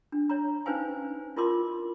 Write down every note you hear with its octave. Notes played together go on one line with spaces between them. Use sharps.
D4
C#5 A#5
C#4 D#4 B4 C5 F5 G#5
E4 F4 A#4 D#5 C6 D6